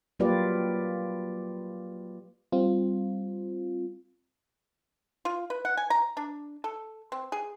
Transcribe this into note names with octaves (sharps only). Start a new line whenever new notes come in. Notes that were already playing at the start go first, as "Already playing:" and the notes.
F#3 A#3 F4 G4 B4 D5
G3 C4 F4
F4
B4
F#5
G#5
A#5
D4
A4
C4
G#4